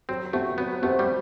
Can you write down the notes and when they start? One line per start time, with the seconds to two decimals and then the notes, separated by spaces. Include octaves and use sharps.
0.09 F#3 C4
0.33 A3 C4 F#4 C5
0.58 F#3 B3
0.82 A3 C4 F#4 C5
0.99 G3